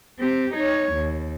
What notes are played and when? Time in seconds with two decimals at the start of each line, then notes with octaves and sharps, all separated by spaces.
0.19 C4 G4
0.54 D#4 C#5
0.93 D#2